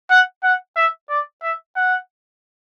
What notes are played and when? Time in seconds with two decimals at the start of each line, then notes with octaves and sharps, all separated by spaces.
0.10 F#5
0.43 F#5
0.76 E5
1.10 D5
1.42 E5
1.76 F#5